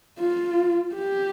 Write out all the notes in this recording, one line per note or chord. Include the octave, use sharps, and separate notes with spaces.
F4
G4